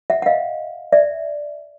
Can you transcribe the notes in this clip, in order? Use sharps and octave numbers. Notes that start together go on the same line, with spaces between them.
E5 F#5
F#5
D#5 F5
D5 E5